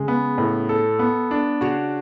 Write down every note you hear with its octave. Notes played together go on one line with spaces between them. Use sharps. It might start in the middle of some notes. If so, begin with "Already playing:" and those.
Already playing: C#3 G#3
B3
A2
A4
B3
D4
C#3 F#4